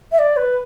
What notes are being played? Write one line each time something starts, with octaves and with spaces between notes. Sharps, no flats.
E5
D5
B4